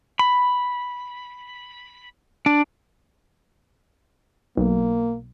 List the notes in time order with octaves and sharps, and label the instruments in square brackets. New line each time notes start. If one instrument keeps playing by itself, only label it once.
[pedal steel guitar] B5
D4
[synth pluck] B1 [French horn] A#3